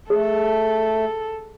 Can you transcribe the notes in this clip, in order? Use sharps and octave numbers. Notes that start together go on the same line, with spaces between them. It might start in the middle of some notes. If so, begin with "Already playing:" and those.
A3 G#4 A4